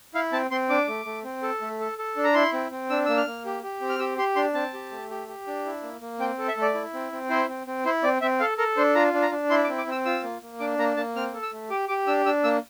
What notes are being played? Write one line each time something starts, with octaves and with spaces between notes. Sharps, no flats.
E4 F5
C4 A5
C4 C6
D4 D6
A3
A3
C4
A4
A3
A4
A4
D4
A#5
E4 C6
C4
C4
D4 E6
A#3 E6
F6
A#3
G4
G4
C4
F6
G4 E6
G4 C6
D4 C6
C4 A5
G4
A3
G4
G4
D4
E4
A#3
A#3
C4 G5
A4
E5
A3
D5
E4
C4
C4
E4 C5
C4
C4
E4 C5
C4 D5
C4 E5
A4 F5
A4 A#4
D4 C5
F4 A#5
D4
A#5
D4
E4 C6
D6
C4
D6
C4
E6
F4 E6
A#3
A#3
D4 D6
A#3 A#5
A#3 A5
C4 F6
A4
E6
A3
G4 D6
G4 D6
D4 E6
D4 E6
A#3 E6